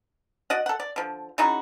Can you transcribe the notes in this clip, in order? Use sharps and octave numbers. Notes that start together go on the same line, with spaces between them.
F#4 D5 D#5 F#5
A4 F#5
D5
D3 F3
C#3 D#4 E4 F#4